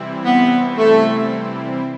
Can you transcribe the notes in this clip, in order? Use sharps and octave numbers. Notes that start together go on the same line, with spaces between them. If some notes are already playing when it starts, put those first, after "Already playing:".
Already playing: C3 E3 G3 C4 E4
B3
A3